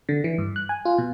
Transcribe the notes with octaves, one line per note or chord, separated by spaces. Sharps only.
D3
E3
G2
F#6
G#5
F4
B2